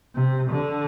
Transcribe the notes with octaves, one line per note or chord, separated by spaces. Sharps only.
C3
D3